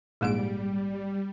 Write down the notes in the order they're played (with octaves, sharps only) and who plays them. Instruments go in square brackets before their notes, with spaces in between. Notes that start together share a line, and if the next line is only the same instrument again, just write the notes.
[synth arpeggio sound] A#1 G#2 D7 [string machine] G3 [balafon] G#3 A#3 G#4